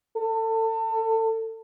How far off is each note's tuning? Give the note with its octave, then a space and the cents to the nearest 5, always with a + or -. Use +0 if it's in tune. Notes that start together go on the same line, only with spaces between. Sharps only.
A4 +30